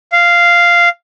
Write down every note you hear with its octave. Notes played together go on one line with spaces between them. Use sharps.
F5